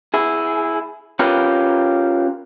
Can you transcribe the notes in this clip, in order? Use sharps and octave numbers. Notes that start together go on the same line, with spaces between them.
E4 G#4
C#4 F4 G4 A#4 B4